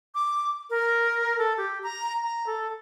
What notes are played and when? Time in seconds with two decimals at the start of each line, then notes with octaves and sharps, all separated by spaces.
0.15 D6
0.70 A#4
1.38 A4
1.58 G4
1.83 A#5
2.23 A#5
2.47 A4